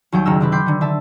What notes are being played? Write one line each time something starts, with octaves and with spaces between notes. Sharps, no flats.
D#2 F#3 G3 G5
F#1 D#3 A#4 E6
C3 C4 B4
G5 B5 C6 D6 G6
D3 D#3
D3 E5 A5